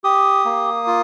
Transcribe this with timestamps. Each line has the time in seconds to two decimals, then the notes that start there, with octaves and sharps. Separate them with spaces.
0.04 G4 D#6
0.45 A#3
0.87 F4